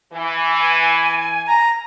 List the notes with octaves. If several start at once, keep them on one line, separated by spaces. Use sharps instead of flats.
E3
G#5
A#5